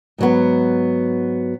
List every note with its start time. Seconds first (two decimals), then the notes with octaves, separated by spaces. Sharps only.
0.18 G#2 F#3 B3